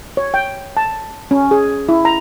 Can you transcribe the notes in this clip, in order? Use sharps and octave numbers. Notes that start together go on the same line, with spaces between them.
C#5
G5
A5
C#4
G#4
E4
A#5